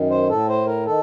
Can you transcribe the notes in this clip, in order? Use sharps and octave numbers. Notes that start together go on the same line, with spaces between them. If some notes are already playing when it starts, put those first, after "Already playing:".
Already playing: F#2 D#3
C5
A2 A4
C5
A#4
D#3 A4